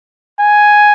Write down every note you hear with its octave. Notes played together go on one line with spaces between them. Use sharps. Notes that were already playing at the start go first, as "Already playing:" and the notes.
G#5